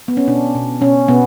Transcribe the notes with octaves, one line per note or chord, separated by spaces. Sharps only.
B3
C#4
B2 D4
B2
B2 C#4
B2 B3